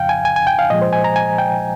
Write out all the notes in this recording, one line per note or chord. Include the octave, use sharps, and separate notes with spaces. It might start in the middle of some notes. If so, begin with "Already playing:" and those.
Already playing: F2 C#3 F3 F5 G5
G#5
G#5
G#5
G5
F5
A#2 F3 G#3 D#5
C5
G#5
A#5
G#5
G5